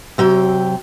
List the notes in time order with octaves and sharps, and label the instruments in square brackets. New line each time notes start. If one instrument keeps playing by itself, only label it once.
[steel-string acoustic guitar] C3 F#3 G5